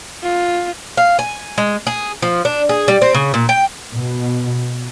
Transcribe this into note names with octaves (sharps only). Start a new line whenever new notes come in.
F4
F5
G#5
G#3
G#4
F3
D4
G#4
G3
C4
C#3
A#2
G5
B2